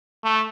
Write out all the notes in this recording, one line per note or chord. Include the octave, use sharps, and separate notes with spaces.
A3